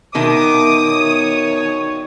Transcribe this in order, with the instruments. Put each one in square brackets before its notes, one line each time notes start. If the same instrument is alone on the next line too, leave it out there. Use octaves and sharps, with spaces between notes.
[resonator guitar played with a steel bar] B2 D#3 [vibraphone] B3 A#4 E5 [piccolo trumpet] D6 [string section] D#6
[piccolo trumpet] C#5